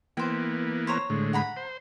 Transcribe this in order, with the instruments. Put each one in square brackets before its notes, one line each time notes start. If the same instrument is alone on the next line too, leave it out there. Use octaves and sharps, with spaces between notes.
[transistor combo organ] E3 A#3 B3 [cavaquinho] C5 G5
[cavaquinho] C5 C#5 A#5
[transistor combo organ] A2 D3 G#3
[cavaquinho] F#5 A#5 B5
[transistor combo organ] C5